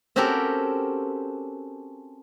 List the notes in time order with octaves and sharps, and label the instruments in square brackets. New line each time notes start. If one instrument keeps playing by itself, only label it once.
[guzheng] C4 C#4 F#4 G4 A4 A#4